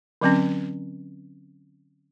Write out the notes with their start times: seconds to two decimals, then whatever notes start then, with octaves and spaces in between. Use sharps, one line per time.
0.21 D3 F#3 C4 C#4